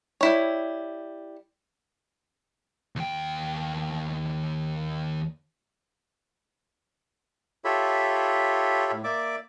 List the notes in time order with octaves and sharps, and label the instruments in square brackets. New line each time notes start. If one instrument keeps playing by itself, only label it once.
[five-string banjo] G3 E4 C#5
[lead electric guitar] D#2 G5
[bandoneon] F4 G4 A4 C#5 E5 B5
A2
A#3 D5 E5 D6